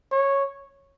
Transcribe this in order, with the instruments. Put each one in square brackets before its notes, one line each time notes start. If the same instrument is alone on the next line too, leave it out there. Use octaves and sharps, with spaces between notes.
[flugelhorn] C#5